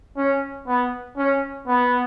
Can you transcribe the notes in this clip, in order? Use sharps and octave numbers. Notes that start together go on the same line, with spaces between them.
C#4
B3
C#4
B3